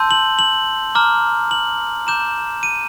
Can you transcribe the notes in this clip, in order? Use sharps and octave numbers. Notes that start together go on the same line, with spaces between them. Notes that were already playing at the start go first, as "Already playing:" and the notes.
Already playing: A5 C6 E6 G6
F#7
F#7
A#5 D6 F6
F#7
A#5 D6 G6 E7
D#7